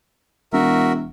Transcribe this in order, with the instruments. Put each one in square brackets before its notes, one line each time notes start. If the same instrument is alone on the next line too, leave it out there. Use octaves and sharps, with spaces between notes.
[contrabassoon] E1 [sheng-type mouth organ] F#4 A#4 E5